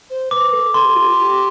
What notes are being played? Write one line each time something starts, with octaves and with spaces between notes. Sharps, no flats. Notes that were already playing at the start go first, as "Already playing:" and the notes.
C5
B4 D6
A4
A4 C6
G4
F4
G4